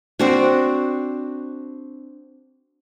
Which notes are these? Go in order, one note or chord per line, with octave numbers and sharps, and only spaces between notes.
C4 D4 F#4